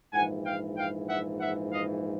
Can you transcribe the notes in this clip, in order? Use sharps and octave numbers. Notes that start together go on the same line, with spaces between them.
A#1 G#2 E3 F#5 G#5
F5 G5
F5 G5
E5 F#5
E5 F#5
D#5 F5